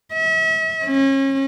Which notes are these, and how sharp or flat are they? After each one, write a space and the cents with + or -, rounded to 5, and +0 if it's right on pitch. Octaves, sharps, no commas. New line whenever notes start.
E5 -40
C#4 -35